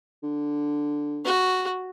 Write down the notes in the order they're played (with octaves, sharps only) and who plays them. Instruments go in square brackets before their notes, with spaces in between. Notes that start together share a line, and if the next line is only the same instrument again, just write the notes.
[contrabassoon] D3
[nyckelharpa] F#4